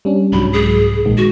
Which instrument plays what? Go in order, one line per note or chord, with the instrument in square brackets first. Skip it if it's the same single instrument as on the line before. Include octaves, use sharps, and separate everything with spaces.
[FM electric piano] G3 C#4 D4
[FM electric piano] C2 G#2 F#3 [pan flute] B5
[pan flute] G#4
[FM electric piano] A#1 D#3 G#3
[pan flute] F#4